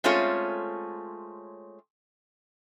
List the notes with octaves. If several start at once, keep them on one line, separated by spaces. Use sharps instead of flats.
G#3 A3 C4 C#4 F4 C#5